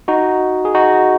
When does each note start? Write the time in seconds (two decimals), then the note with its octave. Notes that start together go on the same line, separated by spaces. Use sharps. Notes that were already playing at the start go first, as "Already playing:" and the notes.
0.08 D#4 F#4
0.65 G#4
0.74 D#4 F#4